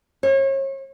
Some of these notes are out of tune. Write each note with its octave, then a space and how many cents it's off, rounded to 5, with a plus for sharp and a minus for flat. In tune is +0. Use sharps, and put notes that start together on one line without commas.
C#5 -35